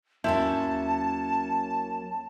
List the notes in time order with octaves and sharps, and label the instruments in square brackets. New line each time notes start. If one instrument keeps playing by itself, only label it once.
[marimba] D#2 C6 G6 [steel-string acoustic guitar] F#3 A#3 C#4 [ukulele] E4 [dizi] A5